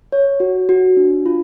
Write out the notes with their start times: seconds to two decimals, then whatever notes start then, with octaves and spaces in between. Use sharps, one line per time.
0.12 C#5
0.40 F#4
0.69 F#4
0.97 D4
1.26 F4